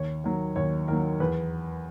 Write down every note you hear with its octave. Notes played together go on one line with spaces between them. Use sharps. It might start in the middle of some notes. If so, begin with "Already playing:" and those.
Already playing: D#2 C#5
D#3 F#3
D#2 C#5
D#3 F#3 A#4
E2 B4